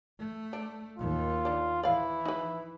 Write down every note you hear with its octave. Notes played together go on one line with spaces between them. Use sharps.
A3
D4
D#2 D#3 F4
D4 D5
E3 E4 D5 F5
D#4 B4